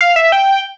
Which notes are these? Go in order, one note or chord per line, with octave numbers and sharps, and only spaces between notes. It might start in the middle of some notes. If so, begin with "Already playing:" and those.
F5
E5
G5